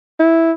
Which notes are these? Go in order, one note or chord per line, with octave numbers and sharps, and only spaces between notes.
E4